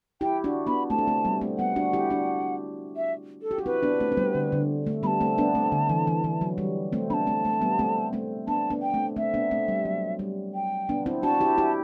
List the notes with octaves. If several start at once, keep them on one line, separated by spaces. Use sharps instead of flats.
E4 G4 G5
D4 F#4
B3 D4 B5
A3 C4 A5
D4
A3 C4
G3 B3
A3 C4
G3 B3 F#5
D4 F#4
E4 G4
D4 F#4
E5
A4
G4
F#4
C4 E4 B4
B3 D4
A3 C4
C4
G3 B3
D3
D3
A3
G3 B3 B5
A5
A3 C4
B3 D4
A3 C4
D3
E3
E3
E3
F#3
G3
A3 C4
B3 D4 B5
A5
A3 C4
A3
G3 B3
A3 C4
A3 C4
B3 D4 A5
B3 D4
G5
A3 C4
A3 C4 E5
B3 D4
A3 C4
G3
F#3
G3
G5
B3 D4
C4 E4
D4 F#4 A5
E4 G4
E4 G4